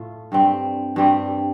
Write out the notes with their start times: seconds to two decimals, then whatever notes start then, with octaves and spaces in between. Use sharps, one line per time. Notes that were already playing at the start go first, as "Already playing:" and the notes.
Already playing: A2 A3 F4
0.32 G2 G3 C4
0.96 G2 G3 C4